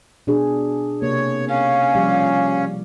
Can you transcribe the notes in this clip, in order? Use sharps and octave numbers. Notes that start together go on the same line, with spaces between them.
B2 D4 G#4
C3 A#3 C#5
C#4 F5
F3 G3 D5